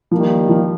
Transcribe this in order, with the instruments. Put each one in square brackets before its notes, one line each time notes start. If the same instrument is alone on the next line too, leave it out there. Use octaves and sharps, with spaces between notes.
[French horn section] D#3 G3 A#3 [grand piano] F3
[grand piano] F3